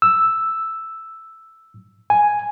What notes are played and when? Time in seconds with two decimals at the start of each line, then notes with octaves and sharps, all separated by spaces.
0.02 E6
2.10 G#5